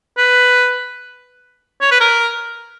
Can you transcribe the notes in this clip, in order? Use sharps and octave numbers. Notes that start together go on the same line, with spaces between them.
B4
C#5
B4
A#4